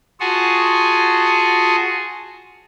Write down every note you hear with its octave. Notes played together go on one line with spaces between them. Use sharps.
F4 F#4 G#4 F#5 G#5 A5